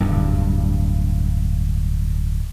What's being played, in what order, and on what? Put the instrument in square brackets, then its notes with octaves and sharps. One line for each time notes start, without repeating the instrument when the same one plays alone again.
[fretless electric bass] D1 G1 G2